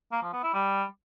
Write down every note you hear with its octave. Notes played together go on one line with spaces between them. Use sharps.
A#3
F3
B3
E4
G3